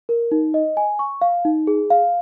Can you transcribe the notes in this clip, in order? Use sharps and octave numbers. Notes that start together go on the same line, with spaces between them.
A#4
D#4
D#5
G#5
C#6
F5
D#4
G#4
F5